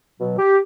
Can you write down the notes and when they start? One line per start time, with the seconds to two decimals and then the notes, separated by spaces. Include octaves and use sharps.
0.20 B2 F#3
0.39 G4